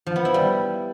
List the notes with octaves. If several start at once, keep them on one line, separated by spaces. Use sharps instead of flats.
F3
B3
E4
G3